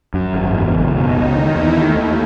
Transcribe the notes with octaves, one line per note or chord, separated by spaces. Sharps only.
F#2
G#1
E2
F#1
B2 D#4
C#2
D#3 E4
E2
D#3 A3
D#2